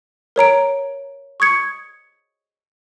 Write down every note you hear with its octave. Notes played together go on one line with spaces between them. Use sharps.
A#4 C#5 A#5 D7
C#6 D#6 G#6 C#7